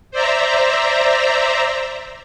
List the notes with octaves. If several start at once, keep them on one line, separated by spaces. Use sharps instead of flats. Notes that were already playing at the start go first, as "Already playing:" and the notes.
C5 D5 E5 A#5